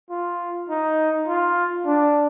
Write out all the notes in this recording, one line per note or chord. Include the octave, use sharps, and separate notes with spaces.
F4
D#4
F4
D4